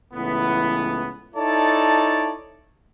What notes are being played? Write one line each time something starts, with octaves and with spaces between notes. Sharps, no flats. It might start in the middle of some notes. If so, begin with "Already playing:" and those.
C#2 A2 E3 B3
D#4 E4 A4 C#5 D5 A5